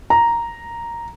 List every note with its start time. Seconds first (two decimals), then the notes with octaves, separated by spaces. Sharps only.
0.10 A#5